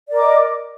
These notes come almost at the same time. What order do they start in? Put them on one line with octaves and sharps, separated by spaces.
D5 A#4 D6 D#5